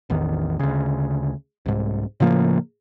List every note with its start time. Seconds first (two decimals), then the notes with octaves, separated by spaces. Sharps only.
0.10 A1 E2 D#3
0.59 D2 C#3
1.66 C2 G#2
2.20 A2 C#3 F3 A#3